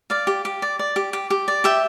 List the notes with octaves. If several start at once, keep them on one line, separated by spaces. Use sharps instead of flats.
D5 F5
G4
G4
D5
D5
G4
G4
G4
D5
G4 E5 G5